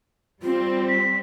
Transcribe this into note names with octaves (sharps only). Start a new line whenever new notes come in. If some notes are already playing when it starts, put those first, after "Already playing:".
G3 C4 F4
B6